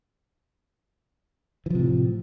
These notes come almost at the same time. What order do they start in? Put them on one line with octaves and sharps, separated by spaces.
E3 F3 C3 A2